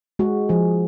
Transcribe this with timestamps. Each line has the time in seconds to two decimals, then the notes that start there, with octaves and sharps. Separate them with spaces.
0.19 G#3 F#4
0.49 F3 G#4